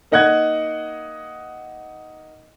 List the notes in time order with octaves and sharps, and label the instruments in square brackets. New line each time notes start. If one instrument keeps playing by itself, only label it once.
[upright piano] A#3 D#4 D#5 F#5 F#6 G#6